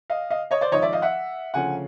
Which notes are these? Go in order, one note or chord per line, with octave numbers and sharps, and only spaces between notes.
D#5 F5
D#5 F5
C#5 D#5
C5 D5
G#1 G#2 F3 C#5 D#5
D5 E5
D#5 F5
E5 F#5
D2 C#3 F3 A3 C#4 F#5 G#5